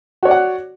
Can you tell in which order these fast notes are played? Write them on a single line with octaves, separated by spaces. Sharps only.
F#4 C#5 D5 F#5